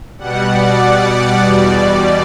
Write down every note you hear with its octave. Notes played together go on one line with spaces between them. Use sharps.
B2 G3 F#5
D5
E2 B2 G3